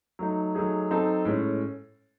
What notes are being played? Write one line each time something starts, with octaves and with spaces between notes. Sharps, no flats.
F#3 A3 D#4
F#3 A3 D#4 G#4
F#3 C4 D#4 A4
A2 G#3 C#4